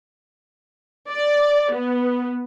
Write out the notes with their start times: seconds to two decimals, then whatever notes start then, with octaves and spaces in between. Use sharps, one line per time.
1.09 D5
1.71 B3